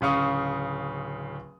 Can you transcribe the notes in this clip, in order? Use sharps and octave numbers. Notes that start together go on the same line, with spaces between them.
D1 C#3 F5 C#6 D#6